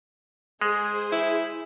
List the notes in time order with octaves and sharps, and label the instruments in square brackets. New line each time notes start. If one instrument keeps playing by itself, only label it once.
[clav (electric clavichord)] G#3 [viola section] G#4 C5
[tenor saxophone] E4